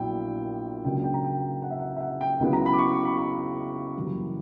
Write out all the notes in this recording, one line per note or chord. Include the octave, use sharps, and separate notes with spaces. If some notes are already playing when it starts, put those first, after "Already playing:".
Already playing: A#1 A#2 F#3 B3 E4 G5
C#2 C#3 F#3 A#3 D4 G5
G5
A#5
G5
F#5
E5
F#5
E5
F#5
G5
C#2 C#3 F#3 B3 E4
A#5
B5
D6
C#6
D6
B5
B5
F#2 C#3 E3 G3 A#3